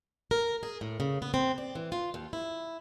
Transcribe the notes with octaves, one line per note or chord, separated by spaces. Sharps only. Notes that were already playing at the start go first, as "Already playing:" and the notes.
A#4
G#4
A2
C#3
B3
C4
D5
E3
F4
D#2
E4